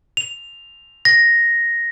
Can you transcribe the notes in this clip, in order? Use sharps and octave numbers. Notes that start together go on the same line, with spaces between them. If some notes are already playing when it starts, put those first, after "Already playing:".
F7
A#6